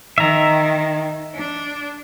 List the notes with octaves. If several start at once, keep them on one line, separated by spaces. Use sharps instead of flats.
D#3 E5 A#5
D4